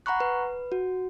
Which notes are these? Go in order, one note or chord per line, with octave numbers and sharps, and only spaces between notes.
F#5 A#5 B5 C#6 F#6
B4
F#4